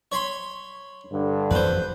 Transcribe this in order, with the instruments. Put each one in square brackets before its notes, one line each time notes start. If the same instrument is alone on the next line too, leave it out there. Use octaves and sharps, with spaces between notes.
[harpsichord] C#5 B5 C6
[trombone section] G2 D3
[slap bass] F2 E3 F#3 [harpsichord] B4 C5